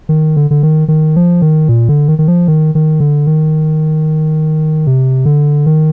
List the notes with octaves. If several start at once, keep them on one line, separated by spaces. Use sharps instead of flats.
D#3
D3
D3
D#3
D#3
F3
D#3
A#2
D3
D#3
D#3
F3
D#3
D#3
D3
D#3
C3
D3
D#3